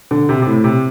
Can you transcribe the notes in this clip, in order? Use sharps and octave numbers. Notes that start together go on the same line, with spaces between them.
D3
C3
C3
A2
C3